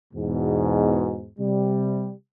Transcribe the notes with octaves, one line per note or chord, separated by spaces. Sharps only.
E2 G#2 B2
C3 G3